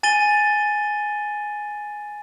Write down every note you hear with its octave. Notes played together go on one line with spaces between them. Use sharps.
G#5 A6 D#7 G7